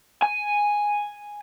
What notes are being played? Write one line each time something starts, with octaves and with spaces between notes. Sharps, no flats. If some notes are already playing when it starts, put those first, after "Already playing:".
G#5